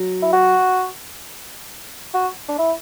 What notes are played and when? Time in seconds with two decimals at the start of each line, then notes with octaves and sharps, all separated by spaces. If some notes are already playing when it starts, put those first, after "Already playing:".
Already playing: F#3
0.22 E4
0.33 F#4
2.14 F#4
2.48 D4
2.58 E4